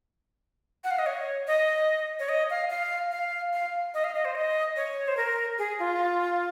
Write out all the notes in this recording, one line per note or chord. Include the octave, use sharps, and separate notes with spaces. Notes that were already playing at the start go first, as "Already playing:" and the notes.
F#5
F5
D#5
C#5
D#5
C#5
D#5
F5
F5
F5
F5
D#5
F5
D#5
C5
D#5
C#5
C5
A#4
G#4
F4